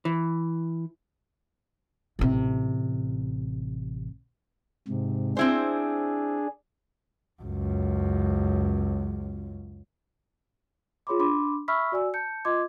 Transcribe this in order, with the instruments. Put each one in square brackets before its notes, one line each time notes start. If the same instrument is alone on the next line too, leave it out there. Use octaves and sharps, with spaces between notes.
[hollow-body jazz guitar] E3
[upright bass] A1 C3
[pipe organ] G#2 C3
[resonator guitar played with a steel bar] C4 E4 C5 [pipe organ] D4 G#4
[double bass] C#2 F#2
[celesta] F4 G#4 C#5 B5 C6 D6
D4 B5 C6 D6
E5 B5 C#6 E6 F6 B6
F#4 D5 G#5 E6
A5 G6 C#7
F4 D#5 C6 D6 G#6